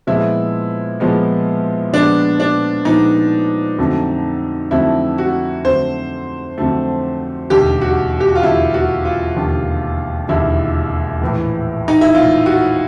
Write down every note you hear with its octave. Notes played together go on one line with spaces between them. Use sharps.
A#2 F3 G#3 B3 E4
A#2 F3 G#3 B3
A#2 F3 G#3 B3 D4
D4
A#2 F3 G#3 B3 D#4
F2 D3 F#3 A3
F2 D3 F#3 A3 E4
F#4
F2 D3 F#3 A3 C5
F2 D3 F#3 A3
E1 D#2 D3 G4
F#4
G4
F#4
F4
E1 D#2 D3 E4
F#4
F4
E1 D#2 D3
E1 D#2 D3 E4
A#1 A2 E3
D#4
E4
A#1 A2 E3 F4
F#4